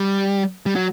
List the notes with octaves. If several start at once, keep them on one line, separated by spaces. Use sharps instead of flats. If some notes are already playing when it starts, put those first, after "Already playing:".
Already playing: G3
G3
F#3